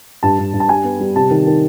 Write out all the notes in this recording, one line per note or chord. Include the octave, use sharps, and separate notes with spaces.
G2 A5
G2
G2
A5
G3 G#5
B3
G3
C3 A5
D#3
D#3